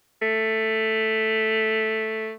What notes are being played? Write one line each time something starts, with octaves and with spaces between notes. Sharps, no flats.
A3